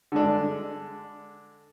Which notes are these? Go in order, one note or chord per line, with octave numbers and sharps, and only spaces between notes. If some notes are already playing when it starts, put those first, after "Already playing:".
D3 G#3 D4